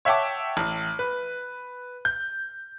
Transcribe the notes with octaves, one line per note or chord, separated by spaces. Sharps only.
C#5 E5 F#5 G5 A5 D6
A1
B4
G6